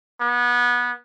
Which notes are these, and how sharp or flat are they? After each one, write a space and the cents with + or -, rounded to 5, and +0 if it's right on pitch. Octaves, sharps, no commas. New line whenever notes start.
B3 -25